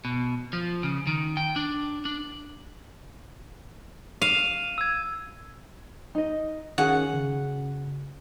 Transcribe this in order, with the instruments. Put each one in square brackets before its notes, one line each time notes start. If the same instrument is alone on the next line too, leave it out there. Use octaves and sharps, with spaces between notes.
[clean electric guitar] B2
F3
C#3
D#3
G5
D4
D4
[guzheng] F5 [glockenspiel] D#7 E7
[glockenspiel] E6 G#6
[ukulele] D#4 D#5
[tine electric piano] D#3 C#4 [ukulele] F#4 G#4 F5 [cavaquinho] F#5
[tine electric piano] C#3